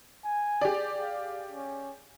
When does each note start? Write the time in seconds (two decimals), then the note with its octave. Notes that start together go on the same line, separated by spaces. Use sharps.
0.24 G#5
0.61 G4 G#4 D5
1.01 F5
1.51 C#4